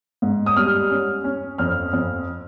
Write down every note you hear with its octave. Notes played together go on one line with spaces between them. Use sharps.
G#2
D#6
G3 F6
C#4
C#4
F2 F6
F2